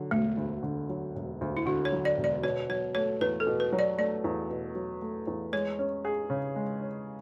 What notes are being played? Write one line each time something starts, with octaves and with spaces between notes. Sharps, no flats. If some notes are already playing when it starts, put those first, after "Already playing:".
Already playing: D3 F#3
E1 A3
D2
D3
F#3
E1
D2
E4
D3 F#4
C#5
F#3
D5
E1
D5
B2 C#5
F#3 C#5
A3 C#5
E2 B4
A4
B2
B4
F#3
D5
A3 D5
E2
B2
F#3
A3
E2
G#3 C#5
C#4
G#4
C#3
G#3
C#4